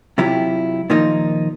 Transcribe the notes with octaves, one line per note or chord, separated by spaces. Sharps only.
C3 F#3 E4 F4 G4
A#2 D#3 F3 A#3 D#4